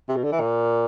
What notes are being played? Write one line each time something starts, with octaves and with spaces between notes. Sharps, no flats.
C3
B2
D3
E3
A#2